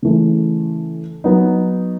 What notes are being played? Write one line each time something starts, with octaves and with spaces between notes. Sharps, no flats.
C#3 E3 A3
F#3 B3 D#4